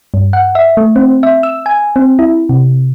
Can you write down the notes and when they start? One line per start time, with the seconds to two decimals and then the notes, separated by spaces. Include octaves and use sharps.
0.14 G2
0.33 F#5
0.55 E5
0.77 A3
0.96 C4
1.23 E5
1.43 E6
1.66 G#5
1.96 C4
2.19 E4
2.49 C3